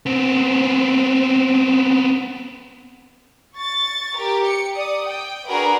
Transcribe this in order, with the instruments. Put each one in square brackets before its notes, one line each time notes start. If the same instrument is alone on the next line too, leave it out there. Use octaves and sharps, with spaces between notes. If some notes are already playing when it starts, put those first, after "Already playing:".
[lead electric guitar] B3 C4
[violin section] C#6 A6
G4 A#4
C#7
D5 D#6
G5
D4 F#4 G#4 A#4 B4